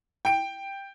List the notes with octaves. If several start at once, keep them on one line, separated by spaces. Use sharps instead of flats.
G5 D7